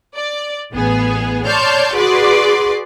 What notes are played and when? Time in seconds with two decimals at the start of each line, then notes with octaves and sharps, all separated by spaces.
0.16 D5
0.72 A1 B3 G#4
1.46 C#5 D5 A5 C6 F6 G6
1.96 F#4 G#4 B4 D5 C6 D6